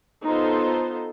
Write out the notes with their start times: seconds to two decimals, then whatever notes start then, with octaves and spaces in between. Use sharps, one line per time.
0.24 B3 D#4 F4 A4 C5